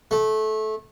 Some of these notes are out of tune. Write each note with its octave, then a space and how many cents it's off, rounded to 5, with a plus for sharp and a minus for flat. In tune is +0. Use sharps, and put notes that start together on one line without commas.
A3 -20